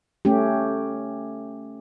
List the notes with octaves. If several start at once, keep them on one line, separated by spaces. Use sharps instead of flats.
A3 C#4 G4